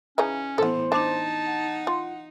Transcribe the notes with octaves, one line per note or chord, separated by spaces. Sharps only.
C#3 E3 C#4 D#4
A2 E3 B3 A4 C5 F#5
D4 D#4 A5
F#5
F4